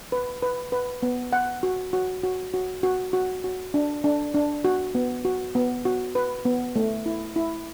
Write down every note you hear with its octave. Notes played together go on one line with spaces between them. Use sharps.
B4
B4
B4
B3
F#5
F#4
F#4
F#4
F#4
F#4
F#4
F#4
D4
D4
D4
F#4
B3
F#4
B3
F#4
B4
B3
A3
E4
E4